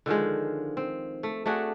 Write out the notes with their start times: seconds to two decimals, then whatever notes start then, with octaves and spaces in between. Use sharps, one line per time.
0.06 D3 D#3 F3 G#3
0.77 C4
1.23 A3
1.46 A3 D4 F#4 G#4